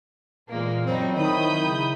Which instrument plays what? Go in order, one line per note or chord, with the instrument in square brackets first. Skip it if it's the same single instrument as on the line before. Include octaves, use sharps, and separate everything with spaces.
[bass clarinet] A#2 [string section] E3 G#3 A#3
[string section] F#2 G3 D#4 [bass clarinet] F#3 [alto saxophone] C4
[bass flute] D#3 [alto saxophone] E4 [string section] B5 D#6 G6
[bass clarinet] C#3